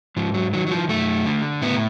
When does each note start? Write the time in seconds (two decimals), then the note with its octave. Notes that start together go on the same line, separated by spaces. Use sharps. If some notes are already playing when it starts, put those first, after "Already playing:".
0.17 G#2 F3
0.34 F#3
0.53 D#3 F#3
0.67 F#3
0.71 F3
0.89 F#2 A3
1.26 D3
1.62 A2 B3